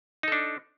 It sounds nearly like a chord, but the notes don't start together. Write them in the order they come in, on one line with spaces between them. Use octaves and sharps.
D#4 A4 D4